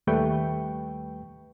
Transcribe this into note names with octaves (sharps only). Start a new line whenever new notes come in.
D#2 G3 A3 B4 G5 C#6